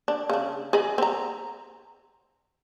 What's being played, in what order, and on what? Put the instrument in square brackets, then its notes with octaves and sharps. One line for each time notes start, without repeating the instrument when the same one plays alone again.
[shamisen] D4
C#3 D4
G#4 D#5 B5
C4 A#5